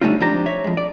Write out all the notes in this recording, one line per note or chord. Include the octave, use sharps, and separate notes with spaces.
D3 G3 A3 C#4 D#4 F4
F2 G#2 D4 G4 A#5
C#5 E5
F2 G#3
D5